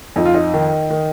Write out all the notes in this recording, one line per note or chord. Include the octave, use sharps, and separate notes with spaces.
F2 D#4
F4
D#4
D#3
D#3